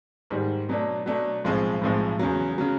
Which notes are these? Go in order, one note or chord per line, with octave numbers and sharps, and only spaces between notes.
G#2 D#3 G3
B2 F#3 A3 D4
B2 F#3 A3 D4
B1 A2 F3 G#3 C4
B1 A2 F3 G#3 C4
E2 C#3 F#3
C#3 F#3